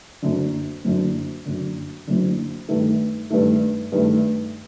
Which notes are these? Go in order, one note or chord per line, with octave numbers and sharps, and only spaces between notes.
F#1 F#2 D3
F#1 F#2 D3
F#1 F#2 D3
F#1 F#2 D3
G2 D#3 A3
G2 D#3 A3
G2 D#3 A3